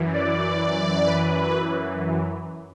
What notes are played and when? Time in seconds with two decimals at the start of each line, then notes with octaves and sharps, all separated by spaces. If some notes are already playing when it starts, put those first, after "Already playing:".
Already playing: F#2 E3
0.14 D5
1.07 B4